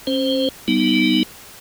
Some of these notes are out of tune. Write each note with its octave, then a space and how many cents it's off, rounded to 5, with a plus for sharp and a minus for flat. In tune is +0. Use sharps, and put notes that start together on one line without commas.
C#4 -35 C5 +0
G3 -25 B3 +5 D#4 +10